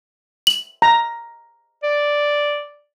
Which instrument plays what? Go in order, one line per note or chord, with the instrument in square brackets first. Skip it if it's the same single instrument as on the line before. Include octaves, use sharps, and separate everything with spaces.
[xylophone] F#7
[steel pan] A#5
[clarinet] D5